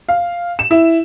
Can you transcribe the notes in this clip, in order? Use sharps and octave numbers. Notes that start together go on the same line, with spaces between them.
F5
E7
E4